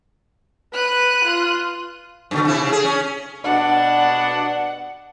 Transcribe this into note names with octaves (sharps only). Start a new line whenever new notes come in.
B4 F#6 D#7
F4
G2 B2 D3
C3 E4
C#3
G#4
C#4
B2 D4 F#5